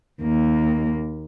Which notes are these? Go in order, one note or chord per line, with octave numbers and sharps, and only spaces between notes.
D#2 A#3